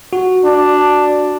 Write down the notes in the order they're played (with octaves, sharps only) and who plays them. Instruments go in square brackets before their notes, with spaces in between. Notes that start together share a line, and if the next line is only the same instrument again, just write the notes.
[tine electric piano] F#4
[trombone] D4